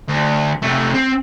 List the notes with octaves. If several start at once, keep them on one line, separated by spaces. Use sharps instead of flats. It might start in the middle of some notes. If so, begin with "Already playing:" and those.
D2
C3 A3
C4